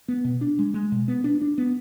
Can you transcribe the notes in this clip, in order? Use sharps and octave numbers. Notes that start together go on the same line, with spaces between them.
B3
B2
D4
G#3
G#3
B2
B3
D4
D4
B3